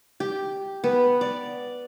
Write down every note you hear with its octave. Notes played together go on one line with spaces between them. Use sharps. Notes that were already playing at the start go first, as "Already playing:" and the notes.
G4
B3
D5